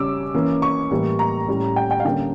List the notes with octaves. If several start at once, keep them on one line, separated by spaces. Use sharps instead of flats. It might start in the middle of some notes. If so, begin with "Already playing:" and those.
Already playing: C#3 G3 C#4 D6 E6
E3 A#3 C#4
C#6
A2 E3 G3 A#3
A#5
A2 G3 C#4
G5
G5
F5
D3 G3 A#3 C#4 G5